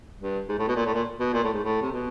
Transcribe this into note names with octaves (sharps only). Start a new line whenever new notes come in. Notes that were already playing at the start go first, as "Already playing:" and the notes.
G2
G#2
A2
B2
A#2
A2
A#2
B2
A#2
A2
G#2
A2
C3
B2